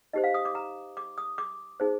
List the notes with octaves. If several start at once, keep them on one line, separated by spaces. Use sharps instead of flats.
D#4 G4 C5 D#5
F5
D#6
D6
A#5
D6
D#6
D6
D#4 G#4 C5